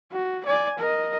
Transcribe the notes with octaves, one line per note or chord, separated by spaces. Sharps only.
F#4
D5 G#5
A#4 D#5